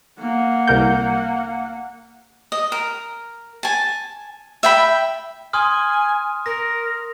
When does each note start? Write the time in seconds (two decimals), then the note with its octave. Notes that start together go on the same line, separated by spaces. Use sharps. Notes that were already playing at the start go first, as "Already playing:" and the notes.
0.19 A#3 F#5
0.68 C2 A#4 G6
2.52 D#5
2.72 A#4
3.63 G#5 A5
4.63 E5 G5 B5
5.53 G#5 C6 D#6 F6
6.46 A#4 A#6